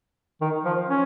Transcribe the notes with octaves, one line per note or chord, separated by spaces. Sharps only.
D#3
F3
C#4